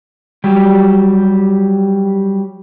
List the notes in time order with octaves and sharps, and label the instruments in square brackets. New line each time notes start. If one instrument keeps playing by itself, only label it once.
[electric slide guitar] F#3 G3 G4